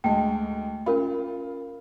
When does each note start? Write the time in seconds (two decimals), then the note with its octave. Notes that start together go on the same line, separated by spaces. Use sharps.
0.04 D2 G#3 G5 A5
0.86 C#4 F4 A#4 B5